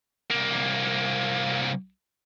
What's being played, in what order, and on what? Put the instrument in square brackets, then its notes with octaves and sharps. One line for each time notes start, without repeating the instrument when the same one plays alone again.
[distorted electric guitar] C2 A#3